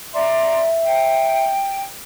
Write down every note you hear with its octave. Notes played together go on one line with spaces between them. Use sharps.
D5 E5 A#5 C6
G5